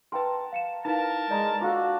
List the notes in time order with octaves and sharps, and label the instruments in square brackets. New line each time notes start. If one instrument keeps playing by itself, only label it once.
[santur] A#4 F#5 A5 [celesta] B4 G5 C6
[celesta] F5 C#7 E7
[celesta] D#4 E4 F5 [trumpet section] A#4 A5 [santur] B4
[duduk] G#3 [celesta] D5 D#5 A#5
[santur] D4 F4 A4 [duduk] F#4